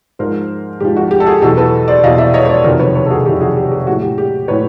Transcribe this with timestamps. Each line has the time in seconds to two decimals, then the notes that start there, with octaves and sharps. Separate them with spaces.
0.19 G#2 F3 A#4 C5
0.80 G#2 F3 G4
0.96 F#4
1.11 G4
1.20 A4
1.26 F#4 G#4
1.42 E2 B2 F#3 G4 A4
1.57 A4 B4
1.88 C5 D5
2.03 E2 B2 F#3 D#5 F5
2.18 D5 E5
2.34 C#5 D#5
2.45 C#5
2.49 C5 D5
2.64 F2 C3 D#3 F#3 A#4 C5
2.79 B4 C#5
2.95 B4 C#5
3.06 A4
3.10 F#4 G#4
3.26 F2 C3 D#3 F#3 G4
3.41 F#4 G#4
3.57 G4
3.72 G4
3.87 A2 F#3 F#4
4.02 G4
4.18 G4
4.48 A2 F#3 B4 C#5